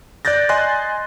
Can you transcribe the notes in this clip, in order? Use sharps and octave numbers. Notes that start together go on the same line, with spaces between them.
D5 F#6 G6 A6 A#6
D#5 G#5 C6 F#6 A6